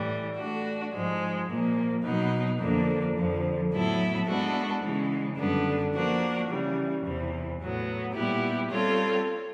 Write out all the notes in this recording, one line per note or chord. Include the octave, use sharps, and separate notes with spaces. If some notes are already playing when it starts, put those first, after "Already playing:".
Already playing: A2 E3 G3
A3 D4 F#4
G#2 F3 G#3
A#2 F3 A#3
B2 F#3 B3 D#4
F2 D3 F3 A#3 D4
F2 D3 F3
A2 F#3 B3 E4 A4
G#3 B3 D4 F#4 A4
C#3 E3 G#3
F#2 D3 G3 B3 D4
F3 A#3 D4 F#4 A#4
C#3 E3 G3
E2 C3 E3
A2 F#3 B3
A#2 G3 B3 E4 G4
G3 C4 F4 A4 C#5